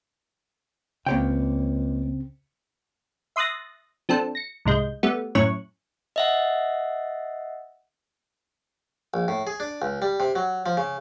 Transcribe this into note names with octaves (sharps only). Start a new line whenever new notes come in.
C#2 C#3 A#3 C4 C#5 G5
E5 C6 D#6 F#6 A6 A#6
F3 C4 D4 A4
A#6 C#7
C2 G#2 G#3 G6
G3 A3 B3
F#2 A2 C#4 C#5 C#6 F#6
D#5 E5 F#5
A#1
A2
G#4
D4
C#2
G3
C3
F#3
F3
C#3